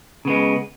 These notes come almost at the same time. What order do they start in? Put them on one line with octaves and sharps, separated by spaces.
C#3 B3 G#3